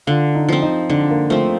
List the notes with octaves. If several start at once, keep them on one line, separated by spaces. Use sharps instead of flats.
D3 F4
D#4
F3 C4
D#4
D3 D4
A#3
F3 A3 C4